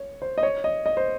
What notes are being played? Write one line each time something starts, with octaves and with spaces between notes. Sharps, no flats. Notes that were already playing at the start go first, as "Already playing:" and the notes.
Already playing: C#5
C5
D#5
C#5
D#5
D#5
C5